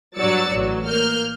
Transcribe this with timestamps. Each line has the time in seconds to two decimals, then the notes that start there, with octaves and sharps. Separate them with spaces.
0.18 G2 F#3 D5 E6 A6 C#7
0.53 A1 F#3
0.87 A#3 F6 G6